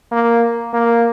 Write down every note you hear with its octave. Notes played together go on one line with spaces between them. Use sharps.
A#3
A#3